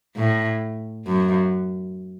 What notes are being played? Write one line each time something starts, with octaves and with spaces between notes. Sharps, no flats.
A2
F#2